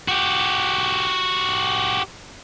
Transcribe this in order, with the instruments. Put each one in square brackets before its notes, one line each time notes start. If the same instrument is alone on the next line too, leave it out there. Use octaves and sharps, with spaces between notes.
[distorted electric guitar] F#4 G4